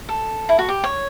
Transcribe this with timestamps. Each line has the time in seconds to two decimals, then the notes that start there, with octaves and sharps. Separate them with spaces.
0.09 A4
0.49 E4
0.59 F#4
0.69 G4
0.84 C#5